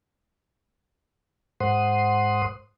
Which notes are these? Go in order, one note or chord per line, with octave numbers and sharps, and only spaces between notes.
G#2 C5 F#5 C6 D#6